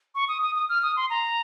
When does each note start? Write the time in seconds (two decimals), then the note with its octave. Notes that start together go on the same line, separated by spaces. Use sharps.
0.15 C#6
0.28 D#6
0.42 D#6
0.56 D#6
0.69 F6
0.83 D#6
0.97 C6
1.10 A#5